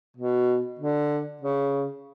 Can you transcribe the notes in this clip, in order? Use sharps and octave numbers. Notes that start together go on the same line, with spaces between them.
B2
D3
C#3